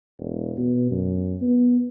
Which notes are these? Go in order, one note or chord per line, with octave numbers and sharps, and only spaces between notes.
E1
B2
F#2
B3